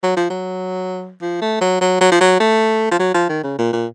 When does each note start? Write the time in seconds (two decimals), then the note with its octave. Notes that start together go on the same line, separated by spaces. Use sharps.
0.03 F#3
0.16 F3
0.30 F#3
1.21 F3
1.41 A3
1.61 F#3
1.81 F#3
2.01 F#3
2.12 F3
2.21 F#3
2.40 A3
2.91 F3
2.99 F#3
3.14 F3
3.29 D#3
3.44 C#3
3.58 A#2
3.73 A#2